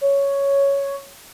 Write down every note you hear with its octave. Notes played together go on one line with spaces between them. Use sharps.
C#5